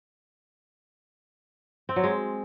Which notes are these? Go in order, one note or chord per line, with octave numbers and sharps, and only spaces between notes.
C4
F#3
G#3